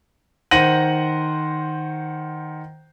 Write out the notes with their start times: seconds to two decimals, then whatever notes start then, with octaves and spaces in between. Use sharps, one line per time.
0.51 D#3 C5 F#5 A#6 D#7 F#7